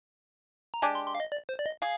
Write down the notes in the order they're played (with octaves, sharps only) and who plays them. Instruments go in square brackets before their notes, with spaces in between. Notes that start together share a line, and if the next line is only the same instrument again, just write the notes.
[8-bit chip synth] A#5
[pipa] G#3 D4 G4 [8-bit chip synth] G#5
[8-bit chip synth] C6
C6
F5
D#5
D5
C5
D5
D#5
[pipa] G#4 [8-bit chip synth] F5